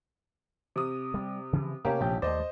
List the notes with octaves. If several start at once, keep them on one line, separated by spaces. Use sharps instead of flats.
C3 D#6
G3
C#3 E3 F3
C3 A3 A#3 C#4 G4
A#1 G5
D#2 A3 C5 D5 D#5